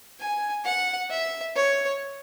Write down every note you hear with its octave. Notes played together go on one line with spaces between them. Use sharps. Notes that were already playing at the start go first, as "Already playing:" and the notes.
G#5
F#5
E5
C#5